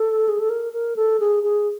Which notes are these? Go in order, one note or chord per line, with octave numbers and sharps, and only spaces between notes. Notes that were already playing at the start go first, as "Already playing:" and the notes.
Already playing: A4
G#4
A4
A#4
A#4
A4
G#4
G#4